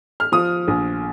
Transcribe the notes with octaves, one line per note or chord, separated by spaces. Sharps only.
F6
F3 D#6
A#1